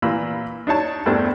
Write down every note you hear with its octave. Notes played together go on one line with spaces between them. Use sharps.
A#2 E3 F4 B5 E6
D4 D#4 C#5 A5
E2 G2 A3 C4 D4